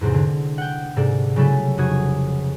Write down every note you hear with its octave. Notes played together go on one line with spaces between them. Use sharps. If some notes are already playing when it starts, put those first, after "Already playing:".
E2 G#2 C3 C4
D3
F#5 G5
G#2 C3 A4 D5
C#3 F#3 G3 A3 E4 A4
F1 F#4 D#6 G#6